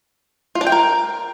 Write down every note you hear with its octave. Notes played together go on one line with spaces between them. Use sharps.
F4
D4
G5
A#4